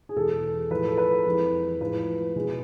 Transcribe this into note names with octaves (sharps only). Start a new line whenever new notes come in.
G#4
E2 B2 G#3 A4
A2 F3 G#3 B4
A4
B4
F2 E3 G#3
A2 F3 G#3 B4
B2 G#3